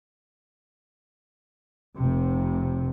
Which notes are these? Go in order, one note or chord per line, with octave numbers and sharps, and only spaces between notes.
F1 C3